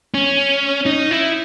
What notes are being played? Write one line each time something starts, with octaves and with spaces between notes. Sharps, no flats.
C#4
D#4
E4